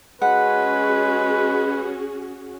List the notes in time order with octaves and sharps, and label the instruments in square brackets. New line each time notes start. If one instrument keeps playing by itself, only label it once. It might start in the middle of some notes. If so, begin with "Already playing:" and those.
[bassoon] G#3 [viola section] C#4 F#4 G#4 [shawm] B4 [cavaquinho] F#5